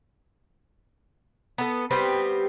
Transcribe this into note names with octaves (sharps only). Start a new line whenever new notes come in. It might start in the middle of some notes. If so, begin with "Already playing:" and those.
B3 A4
G3 B3 C4 G4